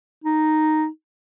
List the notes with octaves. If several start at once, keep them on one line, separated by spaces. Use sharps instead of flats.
D#4